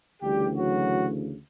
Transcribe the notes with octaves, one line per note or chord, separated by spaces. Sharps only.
D2 C#3 E3 G3 G4
F#3 F#4